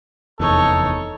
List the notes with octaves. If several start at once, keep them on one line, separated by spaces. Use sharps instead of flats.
F1 E2 D#4 A4 C#5